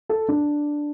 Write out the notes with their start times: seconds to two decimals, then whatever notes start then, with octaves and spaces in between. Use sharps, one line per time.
0.09 A4
0.28 D4